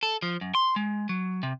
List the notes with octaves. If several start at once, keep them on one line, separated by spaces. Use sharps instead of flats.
A4
F3
F#2
C6
G#3
F#3
C3